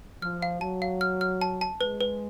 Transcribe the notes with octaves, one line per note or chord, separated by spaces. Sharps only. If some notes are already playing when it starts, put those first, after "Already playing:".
F3 F6
F5
F#3 A5
F5
F6
F6
A5
A5
G#3 B4
B4